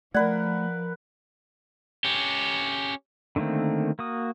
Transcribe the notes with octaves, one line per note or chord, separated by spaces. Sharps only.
F3 A3 A#4 B4 D5 F#5
C#4 G4
D3 D#3 A3 A#3 C4
A#3 F#4 D#6